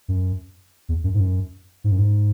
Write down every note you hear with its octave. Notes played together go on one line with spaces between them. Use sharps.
F#2
E2
F#2
G#2
F#2
G#2
F#2
G#2